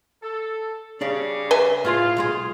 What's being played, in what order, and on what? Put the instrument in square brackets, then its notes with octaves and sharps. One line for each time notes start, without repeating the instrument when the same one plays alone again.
[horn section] A4
[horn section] C#3 G3 C#4 [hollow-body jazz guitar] D4 D5
[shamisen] B4 E5 G#5
[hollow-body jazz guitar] A2 G#4 C6 [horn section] F4
[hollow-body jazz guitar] B1 G#3 G#4